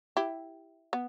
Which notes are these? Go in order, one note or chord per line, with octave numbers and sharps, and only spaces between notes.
E4 G4
B3